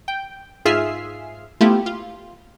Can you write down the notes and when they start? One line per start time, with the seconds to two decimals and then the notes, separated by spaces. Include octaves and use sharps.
0.08 G5
0.65 G#2 F4 G#4 E5 F6 C7
1.61 A3 B3 E4 F4 G4
1.86 F4